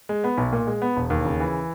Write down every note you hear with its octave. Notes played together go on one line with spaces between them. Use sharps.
G#3
B3
B1
A#2
G#3
B3
E1
D#2
C#3
E3